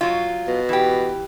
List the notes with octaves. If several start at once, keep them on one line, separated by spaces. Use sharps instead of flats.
F#3 F4
B2
E3 G4